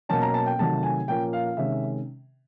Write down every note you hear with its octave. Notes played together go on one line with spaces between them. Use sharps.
B2 F#3 A#3 C#4 A5
A#5
A5
G5
C3 D#3 F#3 A3 A5
G#5
A#2 F3 A#3 C#4 G5
F5
F5
C3 D#3 G#3 C#4 E5